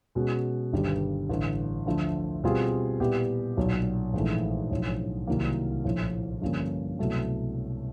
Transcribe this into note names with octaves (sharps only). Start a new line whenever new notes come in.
B2 G#3 C#4 F#4
G1 G2 D#3 G3
A1 G2 D3
D2 D3 F3 A3
B2 G3 C4 F4 G#4
A#2 G3 B3 E4 G4
B1 A#2 F#3
A#1 G#2 E3 A3
B1 A2 F3
C2 C3 D#3 F#3 A#3
A#1 A2 F3
G2 D3 F3 A#3 C#4
C2 B2 F#3 A3